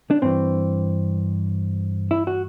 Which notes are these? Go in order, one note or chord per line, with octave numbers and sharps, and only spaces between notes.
D4
G2 E3 C4
E4
F#4